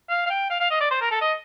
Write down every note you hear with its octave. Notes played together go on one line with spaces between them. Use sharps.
F5
F5
G5
F5
F5
D#5
D5
C5
A#4
A4
D#5